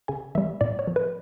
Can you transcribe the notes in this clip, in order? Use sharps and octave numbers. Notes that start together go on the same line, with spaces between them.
C#3 G#5
E3 G3 E5
A2 D5
C#5
F3
B4